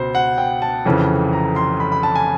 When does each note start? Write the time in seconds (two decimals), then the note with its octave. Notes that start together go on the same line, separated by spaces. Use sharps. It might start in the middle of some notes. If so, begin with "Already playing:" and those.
Already playing: C#2 B2 C5
0.15 F#5
0.38 G5
0.62 A5
0.86 F1 F2 C#3 E3
1.33 A#5
1.56 C6
1.80 B5
1.92 B5
2.03 A5
2.15 G#5